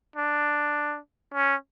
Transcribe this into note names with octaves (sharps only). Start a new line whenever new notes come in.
D4
C#4